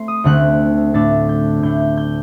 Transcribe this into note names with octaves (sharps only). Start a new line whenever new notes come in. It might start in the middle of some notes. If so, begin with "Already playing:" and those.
Already playing: A3 C4 C6
D#6
D2 D3 A3 C4 F#6
A2 A3 D4 A6
G6
A2 A3 D4 G6
G6
G6